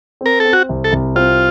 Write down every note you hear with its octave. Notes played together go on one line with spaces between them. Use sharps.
C4 A#4
C4 A4
F#4
C2
A4
C2
C4 F4